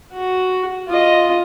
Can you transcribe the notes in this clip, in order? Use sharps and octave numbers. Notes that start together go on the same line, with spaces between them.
F#4
F4 D#5